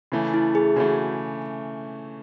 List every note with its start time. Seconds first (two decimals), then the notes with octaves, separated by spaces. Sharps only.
0.12 C#3 E3 A3
0.34 E4
0.55 G#4
0.76 C#3 E3 A3 F#4